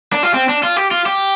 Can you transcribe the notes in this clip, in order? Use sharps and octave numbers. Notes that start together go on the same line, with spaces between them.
D4
F4
C4
D4
F4
G4
F4
G4